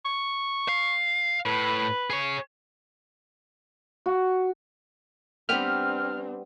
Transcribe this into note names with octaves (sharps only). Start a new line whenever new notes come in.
C#6
F5
A2 B4
G#4 C#5
F#4
G3 B3 C4 D4 G4 F6